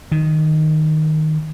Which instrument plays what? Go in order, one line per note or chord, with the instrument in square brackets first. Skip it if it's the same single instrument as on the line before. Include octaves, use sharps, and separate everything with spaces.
[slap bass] D#3